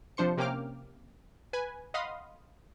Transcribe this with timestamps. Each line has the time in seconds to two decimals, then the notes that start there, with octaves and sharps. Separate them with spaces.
0.17 C3 F3 D4 C5 C#7
0.37 C3 A#3 C#4 G5 D6 F6
1.53 B4 G#5
1.94 D#5 F5 F#5 B5 C6 D#6